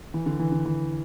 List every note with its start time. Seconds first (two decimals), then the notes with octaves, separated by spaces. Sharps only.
0.14 E3
0.26 D3
0.39 E3
0.52 D3
0.65 E3